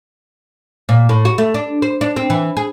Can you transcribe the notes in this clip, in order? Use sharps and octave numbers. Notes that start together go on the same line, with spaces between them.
A#2
A2
F#4
A3
D4
C5
D4
C4
E3
G#4